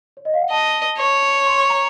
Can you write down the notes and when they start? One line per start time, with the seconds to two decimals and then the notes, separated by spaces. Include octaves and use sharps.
0.17 C#5
0.25 D#5
0.34 F5
0.41 F#5
0.50 D#5 A5
0.98 C#5
1.46 C6
1.58 C#6
1.70 A#5